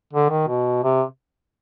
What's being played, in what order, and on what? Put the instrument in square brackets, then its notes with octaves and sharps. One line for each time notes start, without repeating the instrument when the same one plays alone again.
[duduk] D3
D#3
B2
C3